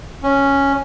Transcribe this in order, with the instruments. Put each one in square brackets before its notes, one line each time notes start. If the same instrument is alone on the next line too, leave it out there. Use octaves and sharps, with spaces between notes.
[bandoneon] C#4